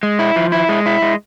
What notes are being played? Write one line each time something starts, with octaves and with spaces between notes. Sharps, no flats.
G#3
E4
F3
E4
G#3
E4
G#3